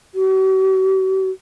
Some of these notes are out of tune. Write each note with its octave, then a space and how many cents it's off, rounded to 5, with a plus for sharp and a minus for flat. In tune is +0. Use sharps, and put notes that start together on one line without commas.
F#4 +45